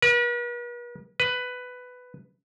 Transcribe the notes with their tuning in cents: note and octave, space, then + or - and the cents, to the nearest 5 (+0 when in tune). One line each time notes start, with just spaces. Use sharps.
B4 -45
B4 +10